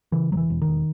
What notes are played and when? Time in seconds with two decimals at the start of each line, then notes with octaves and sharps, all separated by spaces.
0.12 C#3 E3
0.31 E1 F#3
0.37 E3
0.50 E1
0.62 D#3
0.67 E1